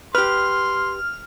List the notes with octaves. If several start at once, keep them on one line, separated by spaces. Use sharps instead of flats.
G4 B4 C6 F6